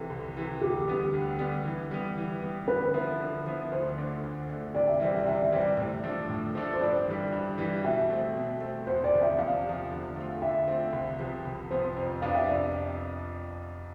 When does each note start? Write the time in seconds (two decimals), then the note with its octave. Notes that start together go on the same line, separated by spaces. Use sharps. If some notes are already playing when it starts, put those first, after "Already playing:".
Already playing: C2 C3 E3 A4
0.10 C2
0.37 C3 E3
0.61 D2 G4
0.88 D3 G3 B3
1.13 D2
1.39 D3 G3 B3
1.65 E3
1.91 G3 B3
2.17 E3
2.42 G3 B3
2.68 D3 B4
2.94 F3 B3 E4
3.20 D3
3.46 F3 B3 E4
3.71 D2 C5
3.98 D3 A3
4.23 D2
4.49 D3 A3
4.75 C3 D5
4.88 E5
5.00 E3 G3 C4 D5
5.15 E5
5.26 C3 D5
5.42 E5
5.52 E3 G3 C4 D5
5.77 A2
6.03 F3 A3 D4 A4
6.29 A2
6.55 F3 A3 D4 A4
6.73 C5
6.81 G2 D5
7.07 E3 G3
7.33 G2
7.58 E3 G3
7.84 B2 E5
8.10 A3 C4
8.35 B2
8.61 A3 C4
8.87 E2 C5
9.04 D5
9.13 C3 F3
9.22 E5
9.38 E2 F5
9.64 C3 F3
9.90 D3
10.16 A3 C4 F4
10.41 D3 E5
10.68 A3 C4 F4
10.93 C2
11.19 C3 F3 B3
11.45 C2
11.71 C3 F3 B3 C5
11.96 F2
12.22 C3 F3 B3 D4 F5
12.35 E5
12.47 F2 D5